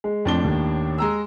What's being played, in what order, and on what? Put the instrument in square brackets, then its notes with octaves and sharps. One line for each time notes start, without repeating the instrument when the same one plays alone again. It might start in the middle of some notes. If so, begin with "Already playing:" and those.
[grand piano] G#3
[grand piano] F2 [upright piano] A2 D4 G7
[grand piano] D#2
[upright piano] G#3 A#5 E6